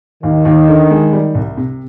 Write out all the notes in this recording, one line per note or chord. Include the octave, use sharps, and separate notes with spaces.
D#2 D#3
D#2
D3
G#3
G3
C2
C3